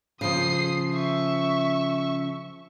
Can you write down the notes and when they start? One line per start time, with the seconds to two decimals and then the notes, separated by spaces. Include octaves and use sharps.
0.21 C#3 F3 D#6 C7
0.95 E5 C#6